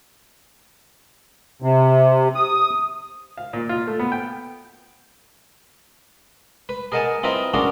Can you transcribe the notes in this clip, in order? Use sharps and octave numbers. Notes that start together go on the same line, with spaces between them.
C3
D#6
F5
A#2
F4
A3
B3
G5
B4
G#4 A#4 D#5 F#5 G#5 A5
C4 E4 F4 B4 D#5 A#5
C#4 D4 F4 F#4 G#4 A#4